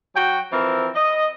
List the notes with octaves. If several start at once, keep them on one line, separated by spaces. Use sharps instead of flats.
F#3 F#4 G5
E3 F3 C4 A#4
D#5